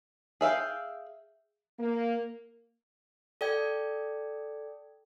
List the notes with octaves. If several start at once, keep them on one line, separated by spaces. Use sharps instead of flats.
G#4 E5 F5 G5
A#3
A4 D5 G5 G#6